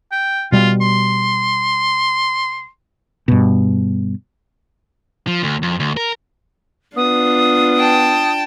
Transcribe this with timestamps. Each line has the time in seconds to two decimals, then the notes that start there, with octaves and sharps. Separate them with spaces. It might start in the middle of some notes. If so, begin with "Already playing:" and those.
0.12 G5
0.52 B2 G3 F4
0.81 C6
3.28 G2 B2
5.27 F3
5.43 D2
5.63 F2
5.80 D2
5.97 A#4
6.96 B3 D4 F4 D#6
7.77 G5 A5